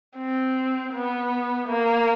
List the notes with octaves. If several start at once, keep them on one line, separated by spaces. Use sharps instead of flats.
C4
B3
A#3